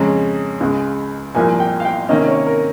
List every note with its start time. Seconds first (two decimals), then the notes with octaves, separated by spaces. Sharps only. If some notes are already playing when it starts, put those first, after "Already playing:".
Already playing: F2 C#3 G#3 C#4 A#5
0.61 C#2 C#3 G#3
1.34 C2 A#2 F3 A#3 G#5
1.60 G5
1.80 F5
1.85 G5
2.09 C3 D#3 A#3 C#4 D#5
2.28 C#5
2.47 A#4